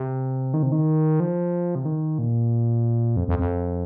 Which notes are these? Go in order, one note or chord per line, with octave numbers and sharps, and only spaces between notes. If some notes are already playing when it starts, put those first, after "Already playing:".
Already playing: C3
D#3
C3
D#3
F3
C3
D#3
A#2
F2
F2
F2